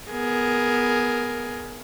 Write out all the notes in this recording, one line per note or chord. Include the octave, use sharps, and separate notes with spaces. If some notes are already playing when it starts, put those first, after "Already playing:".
B3 G#4 A#4